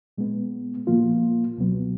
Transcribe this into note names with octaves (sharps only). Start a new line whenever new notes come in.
A#2 G#3 B3
A#2 F3 A#3 F4
C#2 B2 F#3 B3